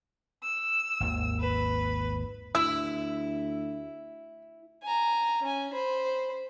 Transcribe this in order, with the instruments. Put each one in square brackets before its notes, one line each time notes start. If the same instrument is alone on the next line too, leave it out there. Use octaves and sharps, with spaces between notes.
[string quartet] E6
[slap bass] G#1 D#2
[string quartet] B4
[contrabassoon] D2 [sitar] E4 [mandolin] E6
[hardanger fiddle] G#5 A#5
C#4 G#5
C5 B5